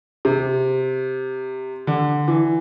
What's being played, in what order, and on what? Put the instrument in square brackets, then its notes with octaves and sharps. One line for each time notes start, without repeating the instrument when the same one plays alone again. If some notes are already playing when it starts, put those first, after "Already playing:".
[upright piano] C3
D3
E3